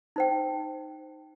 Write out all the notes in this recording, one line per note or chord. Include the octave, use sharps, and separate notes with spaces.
D#4 C5 G5